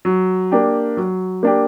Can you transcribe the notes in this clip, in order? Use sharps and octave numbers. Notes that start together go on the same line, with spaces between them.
F#3
A#3 D4 G4
F#3
A#3 D4 G4